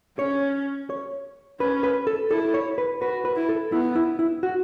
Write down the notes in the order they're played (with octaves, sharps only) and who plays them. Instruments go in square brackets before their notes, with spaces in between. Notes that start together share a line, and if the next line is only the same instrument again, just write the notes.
[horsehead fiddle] C#4 [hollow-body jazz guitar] C#5
[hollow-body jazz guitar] C#5
[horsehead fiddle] C#4 [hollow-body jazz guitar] B4
[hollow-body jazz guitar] B4
A4
[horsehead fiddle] E4 [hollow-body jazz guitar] A4
[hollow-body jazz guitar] C#5
B4
[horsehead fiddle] F#4 [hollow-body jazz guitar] B4
[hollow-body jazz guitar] B4
[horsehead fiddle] E4
[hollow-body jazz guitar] A4
[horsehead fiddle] B3 [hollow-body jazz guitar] E4
[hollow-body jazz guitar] E4
E4
F#4